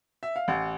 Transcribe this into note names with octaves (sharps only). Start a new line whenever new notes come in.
E5
F5
A1 F#5